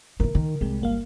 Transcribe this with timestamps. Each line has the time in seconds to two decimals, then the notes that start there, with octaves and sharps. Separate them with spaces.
0.20 D#3 E3 A#4
0.35 D#3
0.61 C2 C3 G3 G#3
0.81 G1 A#3 F5